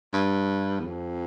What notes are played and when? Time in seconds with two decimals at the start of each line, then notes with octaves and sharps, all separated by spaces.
0.13 G2
0.80 E2
0.87 F2